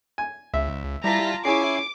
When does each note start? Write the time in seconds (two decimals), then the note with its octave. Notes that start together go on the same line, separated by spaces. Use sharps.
0.18 G#5
0.54 C#2 E5
1.04 G3 E4 F4 A5 A#5 A#6 B6
1.45 C#4 E4 G#4 C#5 G#5 D6 C7